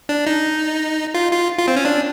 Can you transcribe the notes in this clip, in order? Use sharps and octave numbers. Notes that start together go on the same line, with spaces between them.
D4
D#4
F4
F4
F4
C4
C#4
D4